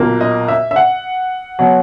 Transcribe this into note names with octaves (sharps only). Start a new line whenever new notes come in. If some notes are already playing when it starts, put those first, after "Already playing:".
Already playing: B1 A#2 A#3
D#5
E5
E5
F#5
B2 F#3